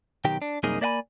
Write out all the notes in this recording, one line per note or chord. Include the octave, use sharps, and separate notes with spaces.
B1 D#3 G4 G5
D4
C2 F#2 A#3 D#4 G#4 D#5
A#3 D5 E5 F#5 G#5 B5